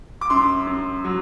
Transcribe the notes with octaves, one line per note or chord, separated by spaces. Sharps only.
D6
F#2 C6
F#2
F#3